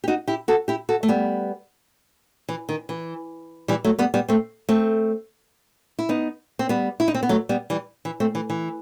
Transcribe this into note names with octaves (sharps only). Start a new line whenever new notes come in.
G4
D#4 F#4
E4 G4
F#4 A4
E4 G4
F#4 A4
A3
G3 B3
E3
D#3
E3
E3 G3
F#3 A3
G3 B3
G3 B3
A3 C4
A3 C4
E4
B3 D#4
C4
G3 B3
E4
D#4
C4
B3
F#3 A3
G3 B3
E3 G3
E3
A3 C4
E3
E3